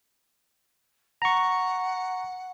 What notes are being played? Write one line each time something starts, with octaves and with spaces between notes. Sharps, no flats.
F#5 A#5 C#6